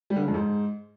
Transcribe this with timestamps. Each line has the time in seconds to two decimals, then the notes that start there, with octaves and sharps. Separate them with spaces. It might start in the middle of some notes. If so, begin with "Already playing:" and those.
0.10 G3
0.16 D3
0.22 C#3
0.28 F2
0.34 G#2